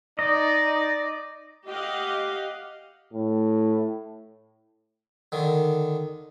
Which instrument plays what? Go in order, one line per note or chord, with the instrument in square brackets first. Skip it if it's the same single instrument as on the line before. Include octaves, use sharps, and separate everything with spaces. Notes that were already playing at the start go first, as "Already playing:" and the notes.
[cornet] D#4 [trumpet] D5 [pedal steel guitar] D#5
[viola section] G4 D#5 F5 F#5
[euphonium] A2
[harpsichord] D3 D#3